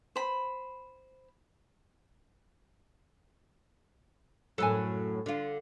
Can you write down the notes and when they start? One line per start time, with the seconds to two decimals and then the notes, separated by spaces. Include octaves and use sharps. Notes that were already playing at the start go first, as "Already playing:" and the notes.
0.16 C5 B5
4.58 F#2 A2 F#3 A4 G#5
5.26 D3 F4